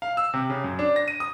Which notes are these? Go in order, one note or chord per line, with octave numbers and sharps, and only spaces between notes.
F5
E6
C3
C#3
F#2
D4
A#6
D#7
D#6